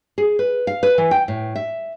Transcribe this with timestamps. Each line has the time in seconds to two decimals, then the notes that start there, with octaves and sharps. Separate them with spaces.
0.18 G#4
0.39 B4
0.67 F5
0.83 B4
0.98 E3
1.11 G5
1.28 A2
1.55 E5